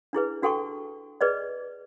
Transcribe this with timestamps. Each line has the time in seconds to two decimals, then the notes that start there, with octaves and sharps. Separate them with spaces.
0.13 D4 E4 G#4 B4
0.42 D4 F#4 A4 G5 A5 C#6
1.21 G#4 B4 D5 D#5